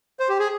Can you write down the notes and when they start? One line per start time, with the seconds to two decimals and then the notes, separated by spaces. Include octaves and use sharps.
0.20 C5
0.29 G4
0.39 G#4